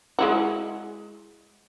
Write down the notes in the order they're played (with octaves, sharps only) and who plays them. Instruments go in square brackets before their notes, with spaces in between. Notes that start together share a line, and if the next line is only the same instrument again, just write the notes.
[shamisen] G#3 E4 F#4